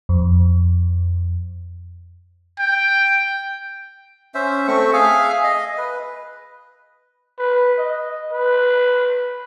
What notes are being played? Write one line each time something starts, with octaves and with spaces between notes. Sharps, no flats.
F2
G5
C#4 C5 E5
A3 C4 C#6
G#4 E5 F5 G#5
D#5
B4
B4
D#5
B4